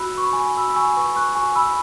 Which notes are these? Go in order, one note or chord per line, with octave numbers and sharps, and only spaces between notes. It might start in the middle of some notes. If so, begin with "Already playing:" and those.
Already playing: F#4 B5 E6 F#6
B4 C#6
B5
G#5 C#6
F#4 B5 E6
E6
G#5 C#6
B4 G#5 C#6
C#6 F#6
F#4 G#5 C#6
B5 E6